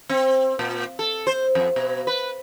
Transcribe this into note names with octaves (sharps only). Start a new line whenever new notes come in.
C4
A#2
A4
C5
F2
B2
B4